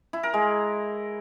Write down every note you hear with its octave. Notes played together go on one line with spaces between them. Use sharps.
E4
A#4
G#3